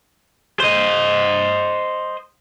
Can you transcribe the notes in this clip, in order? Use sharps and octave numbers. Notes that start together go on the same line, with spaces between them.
C5 D#5